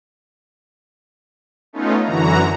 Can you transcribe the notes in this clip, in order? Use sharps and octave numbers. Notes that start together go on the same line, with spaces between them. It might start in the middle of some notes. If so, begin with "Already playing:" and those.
A3 B3 C#4 D#4 F4
F#2 D3 E3 F#4 A#5